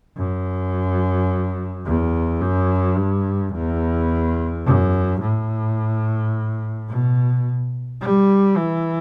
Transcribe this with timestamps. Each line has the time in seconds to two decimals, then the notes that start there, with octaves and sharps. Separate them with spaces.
0.17 F#2
1.86 E2
2.41 F#2
2.98 G2
3.53 E2
4.65 F#2
5.21 A2
6.89 B2
8.01 G3
8.56 E3